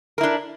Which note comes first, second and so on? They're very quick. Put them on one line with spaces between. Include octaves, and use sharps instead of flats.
A#4 E4 D4